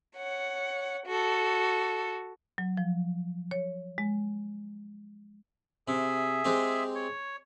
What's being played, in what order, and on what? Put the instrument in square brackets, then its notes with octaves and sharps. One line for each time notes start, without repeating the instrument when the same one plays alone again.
[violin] C#5 F#5
F#4 A4
[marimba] F#3
F3
C#5
G#3
[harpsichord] C3 [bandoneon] G#4 E5
[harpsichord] G#3 C4 G4
[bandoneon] C#5